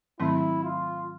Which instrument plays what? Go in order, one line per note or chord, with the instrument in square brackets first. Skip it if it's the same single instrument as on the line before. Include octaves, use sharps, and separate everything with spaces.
[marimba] G#2 D#3 F#3 A3 C4 [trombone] E4
[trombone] F4